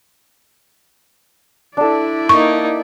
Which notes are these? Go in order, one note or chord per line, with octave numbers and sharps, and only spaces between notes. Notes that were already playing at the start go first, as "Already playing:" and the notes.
D4 E4 A4 D5
A#3 D#4 C#6